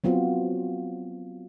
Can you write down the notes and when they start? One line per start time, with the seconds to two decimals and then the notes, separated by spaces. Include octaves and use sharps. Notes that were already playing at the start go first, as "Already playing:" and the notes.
0.04 F#3 B3 C4 F4 F#4